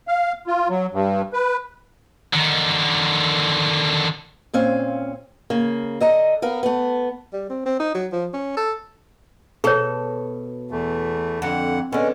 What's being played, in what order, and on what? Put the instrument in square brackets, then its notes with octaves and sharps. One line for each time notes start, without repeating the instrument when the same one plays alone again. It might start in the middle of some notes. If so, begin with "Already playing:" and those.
[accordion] F5
F4
F#3
G2
B4
[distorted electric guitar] D3 D#3
[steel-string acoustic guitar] A#2 C4 C#4 F5
C#3 A#3
D3 D#5 A#5
B3 A#4 F5
A3 B3
[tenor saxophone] G3
C4
C4
D#4
F#3
F3
C#4
A4
[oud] B2 A4 [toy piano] G#4 C#5
[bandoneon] E2 A3
[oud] F2 [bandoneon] D3 F#5
[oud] D3 B3 [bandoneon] G#3 C#4